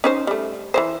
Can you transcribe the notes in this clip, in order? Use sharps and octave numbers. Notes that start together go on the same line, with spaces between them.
C#4 D#4 C5
G3 A3
E3 G#3 C5